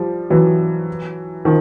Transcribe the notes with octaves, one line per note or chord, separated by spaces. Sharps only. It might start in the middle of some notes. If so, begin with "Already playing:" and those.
Already playing: F3 G3
E3 F#3
D#3 F3